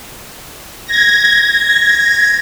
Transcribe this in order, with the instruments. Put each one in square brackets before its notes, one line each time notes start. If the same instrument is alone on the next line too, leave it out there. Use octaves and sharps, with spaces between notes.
[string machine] G#6 A#6